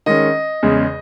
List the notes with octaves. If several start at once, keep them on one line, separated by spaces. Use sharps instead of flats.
D#3 G#3 C#4 D#5
E2 C#3 G#3